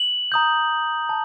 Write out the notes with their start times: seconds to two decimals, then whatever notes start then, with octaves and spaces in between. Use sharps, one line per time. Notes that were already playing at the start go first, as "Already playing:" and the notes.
Already playing: F#7
0.32 A#5 D#6 G6
1.09 A5